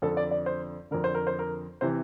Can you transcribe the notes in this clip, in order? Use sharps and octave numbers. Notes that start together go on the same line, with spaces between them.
F2 D3 A4
D5
D5
C5
F2 D3 A#4
C5
A#4
C5
A#4
C3 E3 C5